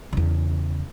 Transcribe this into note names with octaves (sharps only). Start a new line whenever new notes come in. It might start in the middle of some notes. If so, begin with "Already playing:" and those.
E2 C#3